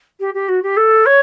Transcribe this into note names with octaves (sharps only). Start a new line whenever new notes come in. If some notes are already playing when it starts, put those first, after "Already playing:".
G4
G4
F#4
G4
A4
C#5